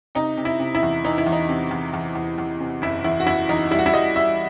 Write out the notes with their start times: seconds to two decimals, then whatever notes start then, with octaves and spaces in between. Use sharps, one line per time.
0.15 C3 D#4
0.37 C3
0.45 E4
0.59 C3
0.75 E4
0.83 E2
1.04 E3 D#4
1.18 E4
1.26 E2
1.32 D#4
1.49 C3
1.71 E2
1.94 E2
2.15 E2
2.38 E2
2.60 C3
2.82 F#1 E4
3.04 E2 E4
3.20 F#4
3.27 E2 E4
3.49 E2 D#4
3.71 G3 E4
3.79 F#4
3.86 E4
3.94 G3 D#5
4.16 G3 E5